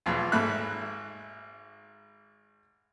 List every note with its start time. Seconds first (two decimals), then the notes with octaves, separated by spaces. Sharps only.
0.06 B1 E2 F3
0.32 G#1 G#2 A4 E5 B5 F#6